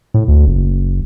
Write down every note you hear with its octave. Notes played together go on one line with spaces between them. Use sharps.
A2
D2
F#1